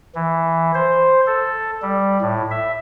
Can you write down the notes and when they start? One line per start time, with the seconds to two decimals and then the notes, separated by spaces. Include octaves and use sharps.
0.15 E3
0.75 C5
1.27 A4
1.82 G3
2.21 A2
2.51 E5